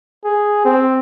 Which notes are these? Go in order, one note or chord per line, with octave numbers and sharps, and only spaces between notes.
G#4
C4